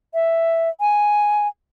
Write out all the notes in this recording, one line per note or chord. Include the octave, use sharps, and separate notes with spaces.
E5
G#5